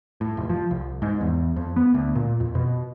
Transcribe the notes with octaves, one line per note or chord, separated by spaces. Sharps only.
A2
F1
F3
C2
G#2
E2
F2
B3
D2
A#2
F2
B2